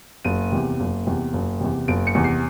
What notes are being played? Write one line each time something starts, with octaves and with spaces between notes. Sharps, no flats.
F#1 D#7
E2 C3
F#1
E2 C3
F#1
E2 C3
F#1 D7
C#7
E2 C3
C7